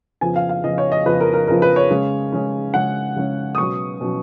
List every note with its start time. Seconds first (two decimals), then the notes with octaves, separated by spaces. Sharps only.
0.21 F2 C#3 F3 B3 G#5
0.36 F5
0.49 F5
0.64 F2 C#3 F3 B3 D#5
0.78 C#5
0.92 D#5
1.06 F2 C#3 F3 B3 B4
1.20 A#4
1.34 A#4
1.47 F2 C#3 F3 B3 A#4
1.62 B4
1.76 C#5
1.90 C#3 G#3 C#4
2.32 C#3 G#3 C#4
2.74 C#3 G#3 C#4 F#5
3.16 C#3 G#3 C#4
3.55 D#6
3.58 B2 F#3 C#4 C#6
4.01 B2 F#3 C#4